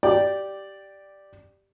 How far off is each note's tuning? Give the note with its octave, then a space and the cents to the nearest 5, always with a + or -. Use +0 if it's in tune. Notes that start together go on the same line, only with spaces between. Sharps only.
G4 -10 D5 +0 G5 +0